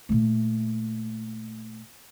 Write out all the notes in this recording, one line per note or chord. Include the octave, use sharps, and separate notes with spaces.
A#2 A3